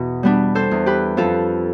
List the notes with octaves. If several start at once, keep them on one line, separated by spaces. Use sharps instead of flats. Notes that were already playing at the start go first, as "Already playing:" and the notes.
Already playing: E2 B2 E4
G3 B3 D4
A4 C5
E2
G4 B4
F2 F4 A4